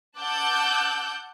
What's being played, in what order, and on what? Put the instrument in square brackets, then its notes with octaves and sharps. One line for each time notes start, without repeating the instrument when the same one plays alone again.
[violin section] F#5 A5 D6 E6 F#6 G6